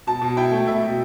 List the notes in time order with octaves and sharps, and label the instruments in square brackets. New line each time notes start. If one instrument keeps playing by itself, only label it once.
[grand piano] B2 [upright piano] A5
[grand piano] B2
[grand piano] E4 [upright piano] G5
[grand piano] A3
[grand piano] B2 [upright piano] E5
[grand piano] B2